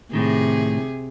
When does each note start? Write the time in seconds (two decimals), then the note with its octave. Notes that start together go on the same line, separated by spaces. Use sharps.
0.13 A2 C3 D#3 G#4